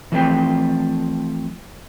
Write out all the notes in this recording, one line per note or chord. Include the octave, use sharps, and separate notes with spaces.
E3 F3 A3 C4 B4 G5